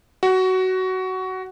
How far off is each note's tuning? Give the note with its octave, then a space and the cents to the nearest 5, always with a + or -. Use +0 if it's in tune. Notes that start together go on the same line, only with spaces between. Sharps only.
F#4 +15